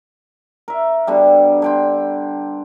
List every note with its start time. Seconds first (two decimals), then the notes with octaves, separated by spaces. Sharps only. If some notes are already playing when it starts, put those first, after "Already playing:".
0.68 A#4 E5
1.07 B2 D3 G3
1.62 D3 G5 C6